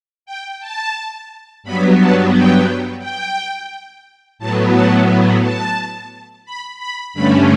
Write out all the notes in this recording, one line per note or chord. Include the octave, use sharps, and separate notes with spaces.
G5
A5
G2 F#3 B3 B5
A5
G5
G5
A2 F#3 B3 A5
A5
A5
B5
B5
G2 D3 A3 C#4 B5